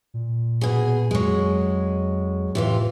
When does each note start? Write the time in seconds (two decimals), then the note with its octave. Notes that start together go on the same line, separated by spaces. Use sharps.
0.14 A#2
0.61 B2 G#4
1.11 F2 F#3 G#3
2.55 A2 C3 E3 F4